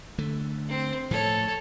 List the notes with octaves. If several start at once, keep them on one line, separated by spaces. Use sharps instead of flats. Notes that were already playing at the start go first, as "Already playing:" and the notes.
D3 A3
C4 C5
A2 F3 A3 A4 C#5